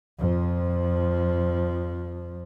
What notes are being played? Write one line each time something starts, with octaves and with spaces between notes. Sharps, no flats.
F2 F3